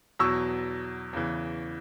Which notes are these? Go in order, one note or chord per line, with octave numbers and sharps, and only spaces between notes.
E2 B2 F#3 C#6 E6
E2 C#3 E3